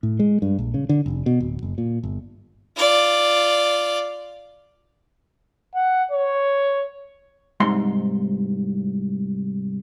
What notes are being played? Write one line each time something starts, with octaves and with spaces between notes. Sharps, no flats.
A2
G#3
G2
A#1
C#3
D3
F1
B2
D1
F#1
A#2
G1
F4 D5
F#5
C#5
C2 G#2 C6